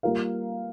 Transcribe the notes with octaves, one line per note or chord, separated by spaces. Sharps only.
G3 A#3 F4 A#4 F5